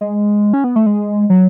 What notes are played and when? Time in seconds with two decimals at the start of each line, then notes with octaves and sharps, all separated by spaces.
0.01 G#3
0.53 C#4
0.64 B3
0.76 A3
0.86 G#3
1.30 F#3